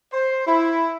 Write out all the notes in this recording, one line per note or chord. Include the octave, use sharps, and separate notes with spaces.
C5
E4